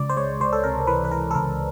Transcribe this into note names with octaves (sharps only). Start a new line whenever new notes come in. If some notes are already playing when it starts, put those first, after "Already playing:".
Already playing: C#2 D5
C5
G#3 C#5
C#2 C5
A4
C3 A#4
E3 B4
B4
E3 A#4
A4
C#2 A#4